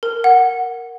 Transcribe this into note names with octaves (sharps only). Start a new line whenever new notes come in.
A#4
F#5